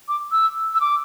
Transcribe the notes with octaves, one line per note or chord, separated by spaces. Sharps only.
D6
E6
E6
D6